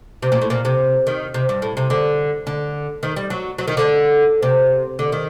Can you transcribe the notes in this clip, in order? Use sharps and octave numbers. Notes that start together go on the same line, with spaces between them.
C3
A#2
A2
A#2
C3
D#3
C3
G2
A2
C3
D3
D3
D#3
G3
F#3
F#3
D#3
D3
C3
D3
D#3